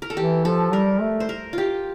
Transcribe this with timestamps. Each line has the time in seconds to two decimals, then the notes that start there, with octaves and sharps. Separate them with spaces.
0.02 A#4
0.10 A4
0.17 E3 G4
0.45 F3 A4
0.73 G3 A#4
1.01 A3
1.20 C5
1.29 A#4
1.53 F4 G4